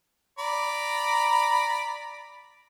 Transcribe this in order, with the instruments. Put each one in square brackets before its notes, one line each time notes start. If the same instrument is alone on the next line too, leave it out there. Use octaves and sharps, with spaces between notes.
[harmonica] D5 A#5 B5